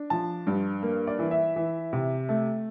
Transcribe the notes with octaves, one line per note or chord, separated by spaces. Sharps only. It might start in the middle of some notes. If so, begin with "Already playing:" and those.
Already playing: D4
F3 A5
G2
A#3
D5
E3
E5
E3
C3
A3